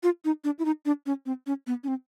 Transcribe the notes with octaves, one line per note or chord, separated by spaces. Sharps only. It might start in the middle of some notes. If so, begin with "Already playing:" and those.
F4
D#4
D4
E4
D#4
D4
C#4
C4
C#4
B3
C#4
C4